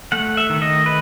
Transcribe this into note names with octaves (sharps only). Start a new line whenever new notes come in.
A3 F#5
E5
D#3
D#5
B4